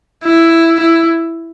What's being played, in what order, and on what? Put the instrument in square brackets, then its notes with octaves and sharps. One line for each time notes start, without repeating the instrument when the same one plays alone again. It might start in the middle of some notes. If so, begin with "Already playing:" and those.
[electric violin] E4
E4